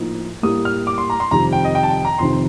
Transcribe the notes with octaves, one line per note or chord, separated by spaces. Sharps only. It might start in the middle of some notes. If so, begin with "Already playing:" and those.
Already playing: A2 F3 A#3 D#4
A2 G3 A#3 D#6
F6
D6
C6
A#5
C6
F2 C3 D#3 G3 A#5
G5
D#5
G5
A5
G5
A#5
F1 F2 C3 D#3 C6